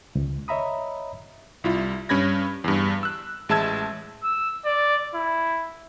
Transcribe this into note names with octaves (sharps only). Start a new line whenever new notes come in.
C#2
C#5 D#5 E5 A#5 B5 D#6
C2 E4 F4
G2 C#4 B5 G#6 A#6
E2 G2
E6 F#6
A1 G#3 E5 A5 E6 G#6
E6
D5
E4